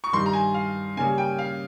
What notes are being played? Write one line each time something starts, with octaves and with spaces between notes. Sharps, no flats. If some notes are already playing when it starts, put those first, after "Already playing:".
C#6
G2 D#3 G3 C6
A#5
G#5
F5
C#3 G3 A#3 C#4 G#5
G5
F5